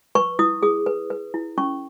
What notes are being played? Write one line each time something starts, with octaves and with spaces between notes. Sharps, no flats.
B4 C#6
E4 D#6
G#4 D#6
B4
B4
E4
C#4 C#6